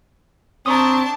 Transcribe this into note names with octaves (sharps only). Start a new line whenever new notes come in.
C4 D4 A5 A#5 C#6 D#6